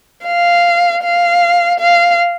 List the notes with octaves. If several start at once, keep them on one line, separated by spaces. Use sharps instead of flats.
F5
F5
F5